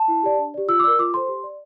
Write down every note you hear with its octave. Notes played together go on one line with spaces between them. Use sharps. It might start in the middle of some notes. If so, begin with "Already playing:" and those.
Already playing: A5
E4
G4 D5
D4
G4 D5
F4 E6
D6
A#4 D5 E6
F4 D6
A4 C5 C6
G4
D5